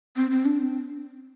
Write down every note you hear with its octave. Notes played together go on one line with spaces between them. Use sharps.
C4
C4
D4
C4